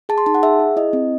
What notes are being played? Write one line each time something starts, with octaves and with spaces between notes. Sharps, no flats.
G#4 A5
C6
D#4 A5
F#5
G#4 E5
G#4
E4 D#5
C4